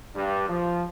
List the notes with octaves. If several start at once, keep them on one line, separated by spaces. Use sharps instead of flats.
G2
F3